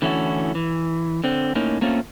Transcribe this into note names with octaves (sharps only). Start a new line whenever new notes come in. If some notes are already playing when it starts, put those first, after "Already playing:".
D3 E3 A3 C#4 E4 F#4
E3
D3 C4
A2 A#3 C#4 D#4
A3 A#3 C4 C#4 F4